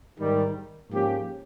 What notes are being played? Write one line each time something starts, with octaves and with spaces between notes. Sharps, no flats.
G#2 D#3 G3
G#2 F3 A#3 C#4 G4